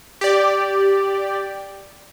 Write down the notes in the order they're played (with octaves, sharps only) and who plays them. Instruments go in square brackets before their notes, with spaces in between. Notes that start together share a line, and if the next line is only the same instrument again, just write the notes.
[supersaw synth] G4 D5